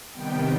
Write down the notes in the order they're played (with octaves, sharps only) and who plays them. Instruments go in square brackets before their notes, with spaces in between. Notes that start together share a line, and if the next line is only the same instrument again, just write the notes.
[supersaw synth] C3 D#3 G3 B3 G5